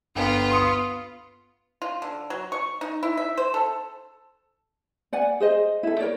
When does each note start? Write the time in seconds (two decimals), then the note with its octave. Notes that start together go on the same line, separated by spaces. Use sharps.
0.16 G1 B3 F4 G5
0.52 C6 D#6 C#7
1.82 F4
2.02 D3
2.30 F#3
2.52 C#6
2.81 D#4
3.03 E4
3.17 E5
3.37 C5
3.54 A4
5.13 D5 F#5 G#5
5.40 G#4 C5 D#5
5.83 E4 A4
5.99 A#4 C#5 D5